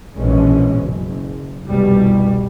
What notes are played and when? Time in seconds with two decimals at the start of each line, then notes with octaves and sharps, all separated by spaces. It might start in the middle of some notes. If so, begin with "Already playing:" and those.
0.17 A#1 G#2 B2 E3 G#3 C#4
0.81 F#1
1.66 F1 C2 B2 G3